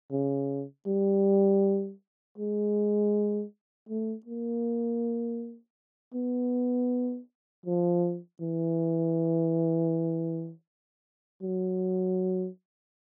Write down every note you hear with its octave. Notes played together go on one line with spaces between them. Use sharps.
C#3
G3
G#3
A3
A#3
B3
F3
E3
F#3